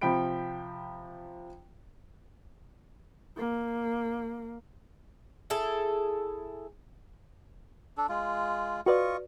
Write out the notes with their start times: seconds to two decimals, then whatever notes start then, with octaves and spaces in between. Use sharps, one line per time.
0.01 C3 F3 G5 B5 D7
3.37 A#3
5.50 E4 G#4 A4
7.98 D4 A4
8.09 G#3 F4
8.86 F4 F#4 B4 D5 D#5 C#6